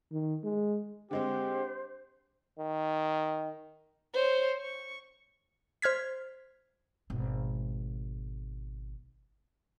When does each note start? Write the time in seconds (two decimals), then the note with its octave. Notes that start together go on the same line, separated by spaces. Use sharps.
0.12 D#3
0.44 G#3
1.11 D3 G#3 C4 G4 C5
2.59 D#3
4.14 C5 C#5
4.61 C#6
5.82 C5 F6 G#6 B6
7.10 G#1 B2